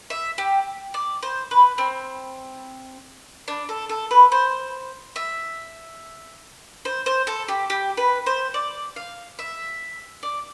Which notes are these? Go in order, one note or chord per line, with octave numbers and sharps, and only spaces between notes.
E5
G4
D5
C5
B4
C4
D4
A4
A4
B4
C5
E5
C5
C5
A4
G4
G4
B4
C5
D5
F5
E5
D5